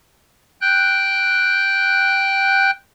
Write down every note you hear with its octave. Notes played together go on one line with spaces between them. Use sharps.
G5 F#6 G6